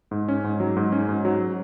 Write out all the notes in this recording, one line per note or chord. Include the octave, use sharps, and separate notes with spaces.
G#2
C#4
G#2
F#3
G#2
C#4
G#2
F#3